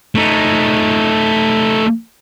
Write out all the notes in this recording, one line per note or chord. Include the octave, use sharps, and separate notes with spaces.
A3 D#4